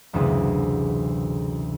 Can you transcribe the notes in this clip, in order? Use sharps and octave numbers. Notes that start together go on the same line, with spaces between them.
F#1 D2 C3 E3 G#4